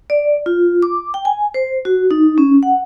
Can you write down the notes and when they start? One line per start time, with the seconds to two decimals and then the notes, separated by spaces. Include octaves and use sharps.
0.10 D5
0.46 F4
0.82 D6
1.14 G5
1.25 G#5
1.54 C5
1.85 F#4
2.11 D#4
2.38 C#4
2.63 F#5